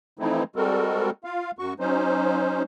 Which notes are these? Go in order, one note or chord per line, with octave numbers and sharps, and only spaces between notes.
E3 F3 A3 C4 D#4 E4
G3 G#3 C4 F#4 A4 A#4
F4 F5
F#2 F#4 C#6
F#3 C#4 D#4 C5